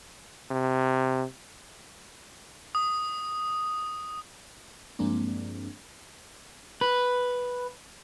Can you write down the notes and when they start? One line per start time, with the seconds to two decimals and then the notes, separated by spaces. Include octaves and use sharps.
0.51 C3
2.75 D#6
4.99 G2 F3 G#3 A#3 C4 D4
6.81 B4